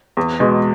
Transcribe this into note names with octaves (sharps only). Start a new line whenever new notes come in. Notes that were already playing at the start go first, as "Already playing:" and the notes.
E2
B2 G#3